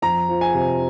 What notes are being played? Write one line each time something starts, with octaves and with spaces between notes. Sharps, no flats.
F2 A#5
F3
G#5
C3